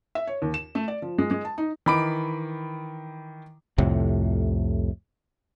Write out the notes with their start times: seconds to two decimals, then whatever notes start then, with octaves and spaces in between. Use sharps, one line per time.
0.15 E5
0.27 C#5
0.42 D#2
0.54 E7
0.75 A3
0.88 D5
1.02 F3
1.18 G#3
1.31 G#3
1.45 A5
1.58 D#4
1.86 D#3 E3 B5 D6 D7
3.78 C2 F2 A2 C3